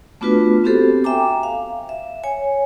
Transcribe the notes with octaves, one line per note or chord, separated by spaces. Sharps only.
A3 B3 D4 F4 F#4 B4
B3 C4 F#4 G4 A4 C5
E5 G5 G#5 A#5 D6
F5
E5
C#5 G#5